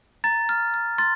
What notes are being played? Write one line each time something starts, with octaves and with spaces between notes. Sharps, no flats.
A#5 A6
F6
F6
C6 A6